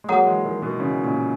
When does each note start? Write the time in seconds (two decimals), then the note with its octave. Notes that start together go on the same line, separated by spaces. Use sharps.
0.04 G#3
0.09 F#3 A#3 G#4 C#5 F#5 A#5 D#6
0.27 E3 G#3
0.45 D#3 F#3
0.62 B2 D#3
0.80 C#3 E3
1.04 A#2 C#3